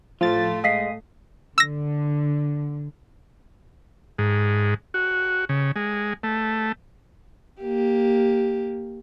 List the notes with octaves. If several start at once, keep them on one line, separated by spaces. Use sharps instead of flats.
A2 F3 A3 F4 A6
G#3 D#5 F5 D#6 B6 C7
D3 E6 A#6
G#2
F#4
C#3
G#3
A3
A#3 G4